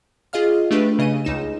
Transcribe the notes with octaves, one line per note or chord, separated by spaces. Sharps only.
F4 G#4 D#5 F5 F6
A3 D4 G4 B4
C#3 D#5 D#7
C#2 D#4 E7